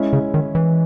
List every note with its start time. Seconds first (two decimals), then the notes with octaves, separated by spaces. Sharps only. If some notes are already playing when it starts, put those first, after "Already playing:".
Already playing: G#3 C#4 E4
0.13 C#3
0.34 D#3
0.55 E3